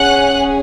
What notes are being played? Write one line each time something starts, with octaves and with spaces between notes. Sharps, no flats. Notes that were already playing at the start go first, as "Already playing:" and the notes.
Already playing: C#4 G#4 F#5 F#6